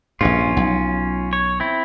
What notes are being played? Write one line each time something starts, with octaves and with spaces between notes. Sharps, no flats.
A#1 G2 C#4 F4
B1
C#5
C4 E4